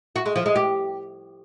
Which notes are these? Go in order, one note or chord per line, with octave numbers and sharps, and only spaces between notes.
F#4
G#3
F3
G#3
G4